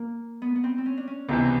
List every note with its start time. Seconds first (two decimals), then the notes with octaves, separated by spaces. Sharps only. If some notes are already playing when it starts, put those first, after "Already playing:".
Already playing: A#3
0.42 B3
0.56 B3
0.64 C4
0.78 C4
0.86 C#4
0.98 D4
1.07 C#4
1.29 C#2 C3 E3 B3